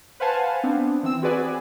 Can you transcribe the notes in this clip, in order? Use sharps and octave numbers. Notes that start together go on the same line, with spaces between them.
B4 C5 F5 F#5 G#5 A5
B3 C4 D4
E3 C4 E6
C4 F#4 G#4 B4 D5 G#5